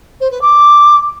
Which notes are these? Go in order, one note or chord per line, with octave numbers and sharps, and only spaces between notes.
C5
B4
D6